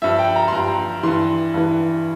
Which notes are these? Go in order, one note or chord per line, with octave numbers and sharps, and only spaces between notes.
G2 F3 E5
G5
A#5
C6
G2 F3 A#5
G2 E3 C6
G2 E3